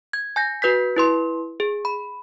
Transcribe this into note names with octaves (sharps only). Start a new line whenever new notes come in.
G#6
G#5 G6 A#6
F#4 B4 G6 B6
E4 B4 C6
G#4
B5